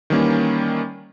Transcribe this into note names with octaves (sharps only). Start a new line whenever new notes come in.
D#3 E3 G3 A#3 C#4